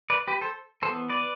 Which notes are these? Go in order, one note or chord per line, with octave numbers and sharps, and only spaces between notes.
B4 D5
G4 B4
A4 C5
E3 B3 A4 C5
B4 D5